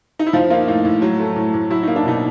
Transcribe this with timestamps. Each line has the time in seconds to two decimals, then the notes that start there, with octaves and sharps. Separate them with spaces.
0.19 D#4
0.27 E4
0.33 F3 D#4 F4
0.50 A#3 D#4 F4
0.68 A2 D#4 F4
0.85 A2
1.02 F#3
1.19 A3
1.36 A2
1.54 A2
1.71 F#3 E4
1.83 A#3 D#4
1.96 D4
2.05 B2 D#4